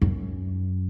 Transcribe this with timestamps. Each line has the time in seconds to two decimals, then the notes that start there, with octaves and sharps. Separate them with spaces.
0.02 F#2